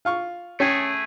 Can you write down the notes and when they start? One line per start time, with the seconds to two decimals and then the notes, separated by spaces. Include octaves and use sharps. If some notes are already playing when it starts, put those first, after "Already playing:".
0.05 F4 F5 C#6
0.60 A3 C#4 G#4 G5